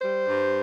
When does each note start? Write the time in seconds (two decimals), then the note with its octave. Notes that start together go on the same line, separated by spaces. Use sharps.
0.01 G3 C5
0.28 G2